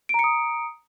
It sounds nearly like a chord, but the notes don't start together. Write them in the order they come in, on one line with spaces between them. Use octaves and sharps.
D7 A#5 C#7 D#6